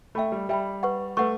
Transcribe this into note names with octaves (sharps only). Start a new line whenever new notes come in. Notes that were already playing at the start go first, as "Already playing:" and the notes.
A3 E5 G5 B5
G3
G3 E5 G5 B5
B4 F#5 C#6
A3 B4 F#5 C#6